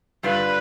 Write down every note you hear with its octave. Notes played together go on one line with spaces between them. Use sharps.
G2 D3 G3 D4 F4 B4